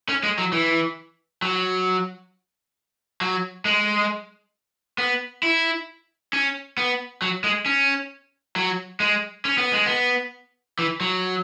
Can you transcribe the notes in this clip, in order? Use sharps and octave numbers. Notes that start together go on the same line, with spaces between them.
C#4
G#3
F#3
E3
F#3
F#3
G#3
B3
E4
C#4
B3
F#3
G#3
C#4
F#3
G#3
C#4
B3
G#3
B3
E3
F#3